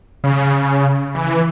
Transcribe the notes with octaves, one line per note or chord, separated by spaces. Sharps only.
C#3
E3